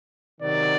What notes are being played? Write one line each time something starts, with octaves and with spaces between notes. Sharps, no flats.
C3 D#3 F#3 D5